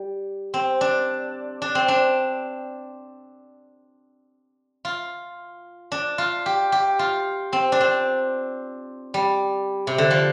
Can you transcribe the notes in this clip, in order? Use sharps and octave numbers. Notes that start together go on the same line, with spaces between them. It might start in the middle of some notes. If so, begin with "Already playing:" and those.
Already playing: G3
C4
D4
D4
C4
D4
F4
D4
F4
G4
G4
F4
C4
D4
C4
G3
C3
D3
F3